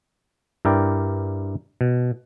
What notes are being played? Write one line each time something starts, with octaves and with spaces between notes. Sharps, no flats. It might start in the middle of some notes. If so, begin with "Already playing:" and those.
G2 E4 A#4 D5 G5
B2